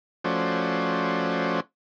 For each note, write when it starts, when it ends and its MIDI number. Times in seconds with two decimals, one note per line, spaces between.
0.24 1.60 53
0.24 1.60 57
0.24 1.60 61
0.24 1.60 66
0.24 1.60 72
0.24 1.60 74